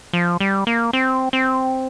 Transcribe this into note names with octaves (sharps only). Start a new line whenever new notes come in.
F3
G3
A#3
C4
C4